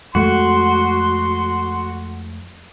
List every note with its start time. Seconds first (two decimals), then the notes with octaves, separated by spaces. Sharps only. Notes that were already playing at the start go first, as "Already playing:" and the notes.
0.15 F2 G#3 A3 F#4 C6